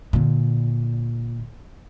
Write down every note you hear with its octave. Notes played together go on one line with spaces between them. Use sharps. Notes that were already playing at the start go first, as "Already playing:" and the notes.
A#2 D3